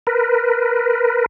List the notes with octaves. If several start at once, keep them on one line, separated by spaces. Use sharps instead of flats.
A#4 B4